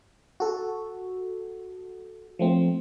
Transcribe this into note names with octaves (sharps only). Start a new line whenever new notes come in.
F#4 A4
F3 A3 C4